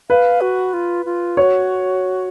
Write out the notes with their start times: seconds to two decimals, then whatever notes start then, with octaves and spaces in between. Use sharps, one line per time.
0.10 B4 F5
0.41 F#4
0.73 F4
1.06 F4
1.37 F#4 C#5